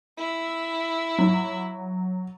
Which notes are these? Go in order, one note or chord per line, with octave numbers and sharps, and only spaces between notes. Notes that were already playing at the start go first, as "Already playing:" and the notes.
E4 E6
F#3